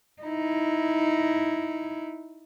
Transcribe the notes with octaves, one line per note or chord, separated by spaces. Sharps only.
D#4 E4